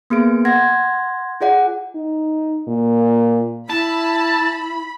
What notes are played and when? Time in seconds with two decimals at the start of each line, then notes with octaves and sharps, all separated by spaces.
0.10 A#3 B3 G#4 D7
0.45 F#5 C6 G#6 A#6
1.41 F4 G#4 D5 F#5
1.96 D#4
2.68 A#2
3.70 E4 A5 B5